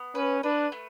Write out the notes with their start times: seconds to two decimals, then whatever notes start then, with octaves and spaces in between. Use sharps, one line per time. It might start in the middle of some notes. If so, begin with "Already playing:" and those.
Already playing: B3
0.15 C#4 B4
0.43 D4 B4
0.72 A3